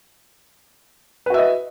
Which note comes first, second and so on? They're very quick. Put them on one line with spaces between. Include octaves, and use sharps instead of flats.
B4 F#4 E5 D#5